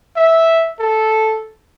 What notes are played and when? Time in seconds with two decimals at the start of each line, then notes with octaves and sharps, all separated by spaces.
0.16 E5
0.80 A4